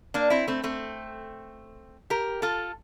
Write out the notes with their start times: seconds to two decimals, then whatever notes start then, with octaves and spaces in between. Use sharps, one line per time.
0.14 A#3 D4
0.30 C4 E4
0.48 A3 C4
0.63 A3 C4
2.10 G4 A#4
2.42 F4 A4